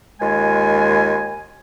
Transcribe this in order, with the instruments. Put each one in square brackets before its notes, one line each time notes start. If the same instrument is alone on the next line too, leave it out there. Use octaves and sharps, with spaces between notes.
[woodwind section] D#2 G#3 F4 G#5